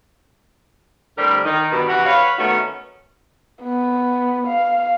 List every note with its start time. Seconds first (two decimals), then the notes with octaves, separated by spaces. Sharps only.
1.18 A2 D3 G3 C4 G4 A#4
1.45 D#3 D#4
1.72 G2 B2 D#3
1.88 C3 E3 F#4 G4 F#5
2.06 B4 C#5 F5
2.38 D#3 A3 B3 C#4 D#4 F#4
3.63 B3
4.47 F5